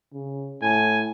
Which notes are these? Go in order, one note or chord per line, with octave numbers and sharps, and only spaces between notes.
C#3
A2 G#5